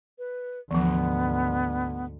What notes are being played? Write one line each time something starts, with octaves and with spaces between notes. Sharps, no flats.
B4
D2 G#2 E3 F3 B3